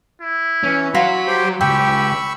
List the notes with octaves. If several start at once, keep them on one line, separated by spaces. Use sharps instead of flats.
E4
E3 C#4
F#3 F#4 F5 B5 C6
G4 C5 G5
C#2 G2 G4 G5 B5 C#6 E6